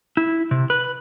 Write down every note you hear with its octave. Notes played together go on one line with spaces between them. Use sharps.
E4
C3
B4